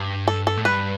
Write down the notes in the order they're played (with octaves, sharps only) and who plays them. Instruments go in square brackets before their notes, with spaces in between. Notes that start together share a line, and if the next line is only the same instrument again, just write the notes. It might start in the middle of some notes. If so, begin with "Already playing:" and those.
Already playing: [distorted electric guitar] G2
[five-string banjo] A4
A4
[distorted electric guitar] A2
[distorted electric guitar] G2 [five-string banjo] B4